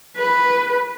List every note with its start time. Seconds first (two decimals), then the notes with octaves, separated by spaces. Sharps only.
0.17 B4